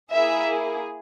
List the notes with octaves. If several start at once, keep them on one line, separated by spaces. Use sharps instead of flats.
A#3 E4 G#4 E5